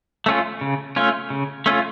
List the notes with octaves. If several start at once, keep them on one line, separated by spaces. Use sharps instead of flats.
A3 C#4 F4
C#3
A3 C#4 F4
C#3
A3 C#4 F4